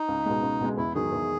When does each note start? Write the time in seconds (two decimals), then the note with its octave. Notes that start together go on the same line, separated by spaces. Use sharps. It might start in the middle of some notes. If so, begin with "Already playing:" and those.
Already playing: D#4
0.08 C#2
0.26 B2 G#3
0.43 C#2
0.61 B2 G#3
0.77 E2 E4
0.95 D#3 F#3 G#4
1.12 E2